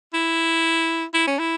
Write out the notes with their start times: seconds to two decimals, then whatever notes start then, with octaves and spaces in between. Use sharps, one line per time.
0.14 E4
1.14 E4
1.28 C#4
1.39 E4